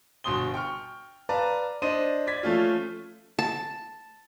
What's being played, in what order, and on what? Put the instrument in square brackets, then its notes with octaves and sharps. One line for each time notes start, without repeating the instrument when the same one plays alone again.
[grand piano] G1 B2 C6 D#6 G7
G5 C#6 F6
B4 D5 F5 A5 A#5
D4 C5 D#5 D#7
D5 G#6 B6
F3 A3 C#4 F4
[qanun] A5